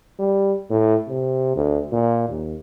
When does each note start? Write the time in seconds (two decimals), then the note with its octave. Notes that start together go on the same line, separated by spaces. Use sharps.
0.19 G3
0.71 A2
1.08 C3
1.56 D2
1.92 A#2
2.29 D#2